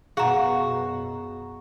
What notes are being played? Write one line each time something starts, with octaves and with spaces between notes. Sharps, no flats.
F#2 B2 F#4 G#4 F5 F#5 A#5